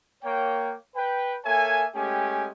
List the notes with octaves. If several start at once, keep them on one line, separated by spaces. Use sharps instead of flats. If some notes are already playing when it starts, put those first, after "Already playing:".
A#3 C#5 G5
B4 G5
A#3 A4 C#5 E5 G#5
G#3 A3 C#4 G4 G5 G#5